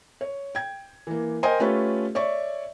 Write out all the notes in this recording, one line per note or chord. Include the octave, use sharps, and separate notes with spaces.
C#5
G5 G#6
E3 A#3
A#4 C5 D#5 G5 G#5
A3 C#4 F4 G4 A4 B4
C#5 D5 E5 C#6